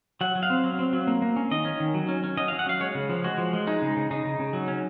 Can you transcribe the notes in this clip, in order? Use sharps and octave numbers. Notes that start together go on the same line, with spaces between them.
F#3 F#5
F#3
F5
C4
F#3
C4
F#3
A#3
A#3
C#4
D#3 D#5
C#4
D#3
F#3
C#4
C#4
F#3 D#5
F#3 F5
F#5
C#4 F5
G#3 C#5
C#3
F3
G#3 F#4
F3
G#3
G#3 D#4
C#3
C#3
C#3 D#4
C#3
C#3
F#3
C#4